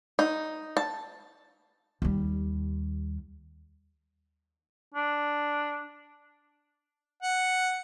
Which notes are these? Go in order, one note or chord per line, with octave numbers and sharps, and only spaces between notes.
D#4
A5
D#2 G3
D4
F#5